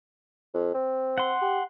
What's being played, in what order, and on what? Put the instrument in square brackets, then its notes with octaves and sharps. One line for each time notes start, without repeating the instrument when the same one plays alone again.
[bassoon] F2
C4
[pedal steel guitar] F#5 C6
[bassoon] G4